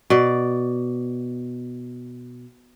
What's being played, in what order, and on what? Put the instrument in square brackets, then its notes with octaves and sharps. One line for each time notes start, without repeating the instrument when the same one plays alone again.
[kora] B2 D5